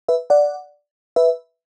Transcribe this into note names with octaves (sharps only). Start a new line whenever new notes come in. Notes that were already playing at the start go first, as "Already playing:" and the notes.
B4 E5
D5 F#5
B4 E5